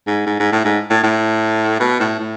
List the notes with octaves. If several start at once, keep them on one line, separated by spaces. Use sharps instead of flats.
G#2
G#2
G#2
A2
G#2
A2
A2
B2
A2
A2